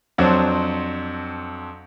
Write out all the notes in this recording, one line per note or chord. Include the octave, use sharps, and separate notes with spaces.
F2 F#3 C4 D4